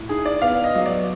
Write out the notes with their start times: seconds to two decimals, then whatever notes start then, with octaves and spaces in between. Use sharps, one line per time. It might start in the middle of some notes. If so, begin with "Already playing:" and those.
Already playing: A2
0.09 D#4 G#4
0.26 D5
0.42 B3 F5
0.64 D#5
0.75 F#3
0.86 D5